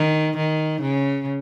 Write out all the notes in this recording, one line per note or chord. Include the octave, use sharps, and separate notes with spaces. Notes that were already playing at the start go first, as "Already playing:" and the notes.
Already playing: D#3
D#3
C#3